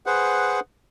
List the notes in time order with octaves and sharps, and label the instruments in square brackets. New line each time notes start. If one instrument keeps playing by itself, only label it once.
[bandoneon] G#4 B4 C5 F#5